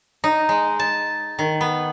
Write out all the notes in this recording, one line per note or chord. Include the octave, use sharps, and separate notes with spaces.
D#4
G#3
A5
D#3
B3